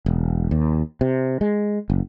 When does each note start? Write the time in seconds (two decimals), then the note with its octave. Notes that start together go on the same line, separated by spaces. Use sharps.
0.06 E1
0.51 D#2
1.01 C3
1.41 G#3
1.90 F#1